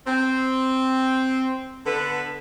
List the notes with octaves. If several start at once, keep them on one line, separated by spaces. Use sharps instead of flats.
C4
D3 B3 A4 B4